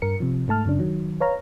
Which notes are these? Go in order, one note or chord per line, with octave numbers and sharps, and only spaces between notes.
G2 A#4 C#7
C3 F3
G#2 A3 A5 F6
F#2 C#3 D4
D#3 F#3
B4 C#5 F5 A#5